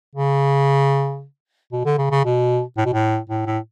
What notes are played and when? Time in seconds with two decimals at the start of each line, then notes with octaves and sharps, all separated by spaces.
0.15 C#3
1.72 B2
1.86 D3
1.98 C#3
2.11 C#3
2.25 B2
2.78 A2
2.85 B2
2.93 A2
3.30 A2
3.46 A2